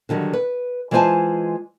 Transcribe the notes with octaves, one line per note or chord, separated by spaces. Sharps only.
D3 D#3 F#3 G3
B4
E3 G#3 F4 C5 G#5 A5